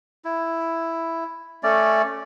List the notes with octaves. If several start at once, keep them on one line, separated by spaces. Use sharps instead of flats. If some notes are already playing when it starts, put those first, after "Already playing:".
E4
A3 C#4 D5